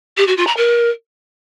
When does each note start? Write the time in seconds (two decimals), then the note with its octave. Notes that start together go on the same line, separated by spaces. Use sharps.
0.17 G4
0.27 F#4
0.37 F4
0.47 A#5
0.57 A#4